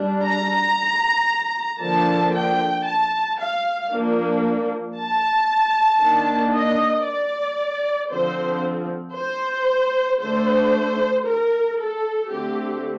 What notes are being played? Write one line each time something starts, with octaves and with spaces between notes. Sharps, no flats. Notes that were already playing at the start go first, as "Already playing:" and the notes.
Already playing: G3 D4
A#5
D3 F3 A#3 D4 A5
G5
A5
F5
F3 A#3 D4
A5
D#3 A#3 D4
D#5
D5
D3 F3 C4 C5
C5
D3 A3 D4 C5
A#4
A4
D3 A3 C4 G4